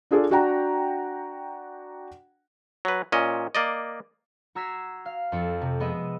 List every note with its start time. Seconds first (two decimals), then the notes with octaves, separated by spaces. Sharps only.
0.11 D4 F4 G#4 A4 D5
0.31 D4 F#4 F#5 G5 A#5
2.85 F#3 B4
3.12 A#2 C#4 D#5
3.55 A#3 D5 D#5
4.55 F#4 A#5 E6 G#6 B6 C7
5.05 F5
5.32 F2 C4 A4 C#7
5.61 C3
5.79 F3 G#3 B3 D#5 E5